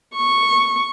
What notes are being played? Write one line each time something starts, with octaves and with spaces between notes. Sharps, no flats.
C#6